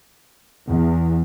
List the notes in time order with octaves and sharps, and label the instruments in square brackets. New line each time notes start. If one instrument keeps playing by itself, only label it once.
[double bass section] E2